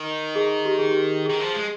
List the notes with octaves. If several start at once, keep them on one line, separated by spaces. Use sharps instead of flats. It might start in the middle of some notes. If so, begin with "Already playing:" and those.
Already playing: D#3
G#4
G4
G#4
G4
D#3 G#4
F3
G#3